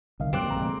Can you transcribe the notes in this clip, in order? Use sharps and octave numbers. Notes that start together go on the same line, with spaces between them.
C2 D3 D#3 D#5 F5
F#2 F#3 A#3 C4 G4 D5 F#6
A#1 C3 G#3 A#5
A3